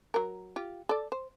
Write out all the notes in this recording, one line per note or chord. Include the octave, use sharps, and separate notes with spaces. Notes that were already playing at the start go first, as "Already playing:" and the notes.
F#3 A#4
F4 G4
A4 D5
C5